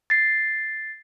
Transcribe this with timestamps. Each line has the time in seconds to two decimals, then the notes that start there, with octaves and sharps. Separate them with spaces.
0.10 A6 C7